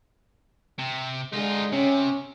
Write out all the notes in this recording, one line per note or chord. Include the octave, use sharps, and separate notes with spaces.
C3
D3 G#3 D#4 F4
C3 C#4